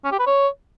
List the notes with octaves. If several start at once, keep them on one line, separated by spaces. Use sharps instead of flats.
C#4
G4
B4
C#5